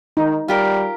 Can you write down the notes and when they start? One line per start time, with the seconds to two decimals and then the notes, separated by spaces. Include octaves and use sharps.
0.17 D#3 D#4
0.48 G3 F4 G4 A#4